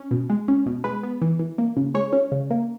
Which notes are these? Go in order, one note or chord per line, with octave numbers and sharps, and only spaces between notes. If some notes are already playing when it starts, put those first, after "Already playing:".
Already playing: C#4
B2
G#3
C#4
B2
G#3 B4
B3
E3
E3
A#3
C#3
G#3 C#5
C#4
C#3
A#3